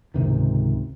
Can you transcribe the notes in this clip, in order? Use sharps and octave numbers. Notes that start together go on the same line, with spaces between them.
C#2 G#2 C3 D#3